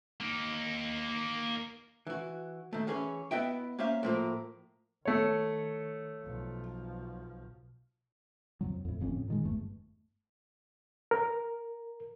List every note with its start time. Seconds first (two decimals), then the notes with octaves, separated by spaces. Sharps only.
0.20 A#3 D#4
2.07 E3 F#4
2.73 D#3 A3
2.87 E3 C#4 G#4 B4 C#5
3.31 B3 E4 D#5 E5 G5
3.79 A#3 C#4 C5 E5 F5
4.03 A2 F3 A#3
5.05 D#3 A3 C#5
6.23 B1 F3
8.61 F2 C3 F#3
8.85 F2 A2
9.00 G1 F2 A2 C#4
9.28 A#2 D#3 G#3
9.44 G1 E2 G2 A3
11.11 A#4